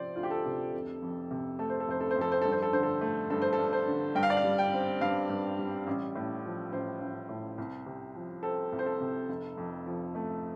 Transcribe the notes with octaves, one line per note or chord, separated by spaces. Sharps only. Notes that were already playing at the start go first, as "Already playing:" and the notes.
Already playing: C3 F3 C4 C5 D5
D2 F4
G4
A4
C3
F1
F2
C3
A3 A4
C5
A4
F1 C5
A4
C5
F2 A4
C5
G2 A4
C5
A4
D3 C5
A4
A3
G2 A4
C5
A4
G2
C5
D3
G2 G5
F5
D5
F5
G3
G5
C4
G2 F5
G2
G3
A1
A2
F3
A1 C5
A1
A2
C2
C3
F3
C4 A4
C2
C5
A4
C3
F1
F2
F3
A3